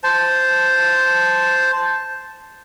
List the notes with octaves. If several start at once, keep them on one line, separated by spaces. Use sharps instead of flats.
C5 A5